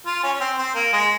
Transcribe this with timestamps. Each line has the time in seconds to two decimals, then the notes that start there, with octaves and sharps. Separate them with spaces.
0.06 F4
0.23 C#4
0.35 C#4
0.40 C4
0.58 C4
0.75 A#3
0.93 G#3